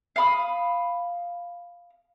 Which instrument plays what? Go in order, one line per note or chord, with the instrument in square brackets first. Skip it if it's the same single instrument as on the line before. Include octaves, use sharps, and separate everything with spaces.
[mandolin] F5 B5 D#6